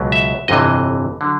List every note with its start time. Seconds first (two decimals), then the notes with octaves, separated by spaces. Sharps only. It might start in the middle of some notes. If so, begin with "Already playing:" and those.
Already playing: C#2 B2 F#3
0.12 E5
0.48 G1 F2 C3 E3 D#5
1.21 D3 F#3